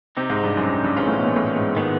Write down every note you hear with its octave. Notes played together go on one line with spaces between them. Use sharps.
C3 C4 D#4 G4
G#2
G2
F#2
F#2
G2
G#2 E3 G#3 C#4 F4
A2
B2
A#2
A2
G#2
D#3 G#3 B3